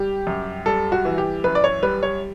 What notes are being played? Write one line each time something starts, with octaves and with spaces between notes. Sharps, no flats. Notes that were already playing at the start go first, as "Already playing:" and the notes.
Already playing: G3 G4
F#2
G3 A4
F#4
E3
G4
F#2 B4
D5
C#5
G3 B4
C#5